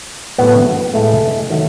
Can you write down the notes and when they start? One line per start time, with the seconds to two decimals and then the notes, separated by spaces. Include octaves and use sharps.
0.38 A2 F#3 A3 B3
0.93 A2 G#3 A3
1.50 D#3 F#3 A3